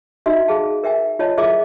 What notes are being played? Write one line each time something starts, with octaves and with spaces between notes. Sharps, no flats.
D#4 F#4 D#5 E5
G#4 F5 A5
A#4 E5 G5 G#5
F4 C#5 D#5 A5
E4 F4 G#4 A#4 E5 D6